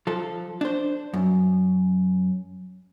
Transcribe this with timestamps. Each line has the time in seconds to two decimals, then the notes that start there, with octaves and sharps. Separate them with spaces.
0.07 F3 A4
0.61 D4 C5
1.14 F#2